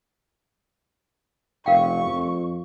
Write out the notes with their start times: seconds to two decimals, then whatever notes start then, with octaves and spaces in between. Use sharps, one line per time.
1.66 F1 A#4 F5 G5 C#6
2.07 F2